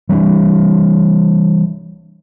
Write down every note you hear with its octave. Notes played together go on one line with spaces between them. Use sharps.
E3 G3 A3 D4